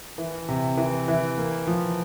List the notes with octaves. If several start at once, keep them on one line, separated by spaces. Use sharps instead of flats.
E3
C3
E3
E3
A#3
F3